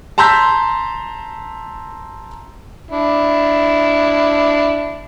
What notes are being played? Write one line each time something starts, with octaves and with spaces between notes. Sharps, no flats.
A5 A#5 C6 E6 G6 B6
D4 E4